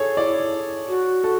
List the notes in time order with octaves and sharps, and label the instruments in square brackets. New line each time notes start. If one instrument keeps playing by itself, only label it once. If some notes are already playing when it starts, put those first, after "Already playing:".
Already playing: [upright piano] G#4 A4 C#5
[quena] E4 [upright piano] D5
[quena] F#4
[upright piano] A4